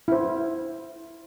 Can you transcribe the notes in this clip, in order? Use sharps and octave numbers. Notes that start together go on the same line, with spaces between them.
E4 C5